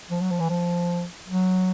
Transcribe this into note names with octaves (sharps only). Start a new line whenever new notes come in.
F3
F#3
F3
E3
F3
F#3